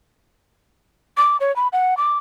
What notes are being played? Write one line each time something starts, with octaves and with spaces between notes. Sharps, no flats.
D6
C#5
B5
F#5
D6